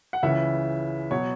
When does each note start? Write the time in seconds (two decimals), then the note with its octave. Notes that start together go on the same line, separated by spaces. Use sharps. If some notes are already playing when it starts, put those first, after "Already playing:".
0.13 F#5
0.23 C#2 C#3 E3 E5
1.11 B2 F#3 C#5